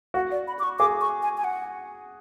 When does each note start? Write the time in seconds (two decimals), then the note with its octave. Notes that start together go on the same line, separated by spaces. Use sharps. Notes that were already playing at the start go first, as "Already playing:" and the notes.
0.14 F#4 F#5
0.31 D5
0.48 B5
0.59 D6
0.63 C#6
0.79 G#4 D6
1.01 C#6
1.22 G#5
1.38 G#5
1.44 F#5